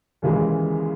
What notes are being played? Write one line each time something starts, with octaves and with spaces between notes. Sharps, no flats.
D#2 C#3 E3 G#3